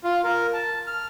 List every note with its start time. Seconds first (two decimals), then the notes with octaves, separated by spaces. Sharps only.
0.04 F4
0.24 A#4
0.53 A5
0.87 F6